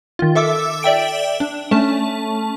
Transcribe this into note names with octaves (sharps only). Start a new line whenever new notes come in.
D#3 F4
A4 E5 D6 E6
D5 E5 G5 D7
D4
A3 C#4 A5